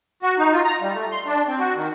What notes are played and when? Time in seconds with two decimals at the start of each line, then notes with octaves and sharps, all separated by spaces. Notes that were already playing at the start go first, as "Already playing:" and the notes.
0.23 F#4
0.38 D#4
0.53 F4
0.65 A#5
0.81 G3
0.94 A3
1.12 C6
1.26 D4
1.48 C4
1.60 F#4
1.75 D#3